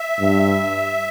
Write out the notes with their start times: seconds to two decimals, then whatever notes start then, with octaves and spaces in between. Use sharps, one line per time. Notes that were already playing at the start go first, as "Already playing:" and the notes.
Already playing: E5
0.20 G2